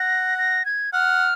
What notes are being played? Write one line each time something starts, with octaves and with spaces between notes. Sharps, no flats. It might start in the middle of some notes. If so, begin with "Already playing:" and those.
Already playing: F#5 A#6
A#6
G#6
F#5 F6